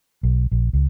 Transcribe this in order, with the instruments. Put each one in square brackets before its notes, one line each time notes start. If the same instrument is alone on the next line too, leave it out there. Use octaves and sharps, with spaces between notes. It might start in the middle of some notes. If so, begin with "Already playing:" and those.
[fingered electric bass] B1
A#1
C#2